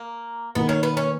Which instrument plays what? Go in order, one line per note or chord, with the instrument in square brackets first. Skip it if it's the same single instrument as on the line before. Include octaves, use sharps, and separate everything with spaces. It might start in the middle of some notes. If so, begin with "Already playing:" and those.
Already playing: [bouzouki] A#3
[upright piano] D#3 A#3 D#4 [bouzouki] B3
[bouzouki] C#4
B3
C#4